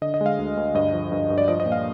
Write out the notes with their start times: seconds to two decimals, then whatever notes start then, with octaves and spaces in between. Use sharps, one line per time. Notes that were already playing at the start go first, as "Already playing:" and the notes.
0.02 D3 D#5
0.14 D#5
0.21 G#3
0.26 F5
0.38 D2
0.57 D2
0.74 G2 D#5
0.93 F3
1.12 G2
1.30 G2
1.38 D5
1.48 F3 D#5
1.60 D#5
1.66 A#2
1.72 F5